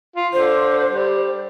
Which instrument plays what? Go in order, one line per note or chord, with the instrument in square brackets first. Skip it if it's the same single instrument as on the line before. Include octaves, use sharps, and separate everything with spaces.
[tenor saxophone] F4
[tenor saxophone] D3 [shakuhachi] C5
[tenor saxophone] G3